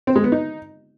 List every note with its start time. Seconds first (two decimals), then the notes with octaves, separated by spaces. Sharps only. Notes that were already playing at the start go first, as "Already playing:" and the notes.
0.07 C4
0.16 G#3
0.24 B3
0.32 D#4